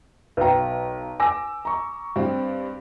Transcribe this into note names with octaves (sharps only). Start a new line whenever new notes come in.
B1 B4 G5 A#5
G#5 D6 E6 A#6
A#5 C#6
G2 C4